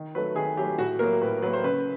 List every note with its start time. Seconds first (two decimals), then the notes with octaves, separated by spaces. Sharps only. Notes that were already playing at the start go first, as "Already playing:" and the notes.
Already playing: D#3
0.15 F#3 A3 B4
0.35 D#3 G#4
0.57 F#3 G4
0.61 A3
0.78 A2 F#4
0.99 F#3 A#3 A#4
1.22 A2 B4
1.42 F#3 A#3 B4
1.53 C5
1.64 C#3 B4